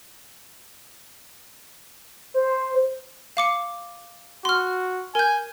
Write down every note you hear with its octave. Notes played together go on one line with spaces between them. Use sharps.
C5
F5 D6 C#7
F#4 C6 F6
A#4 G#5 G6